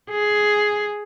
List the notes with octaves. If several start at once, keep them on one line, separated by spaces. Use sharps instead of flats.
G#4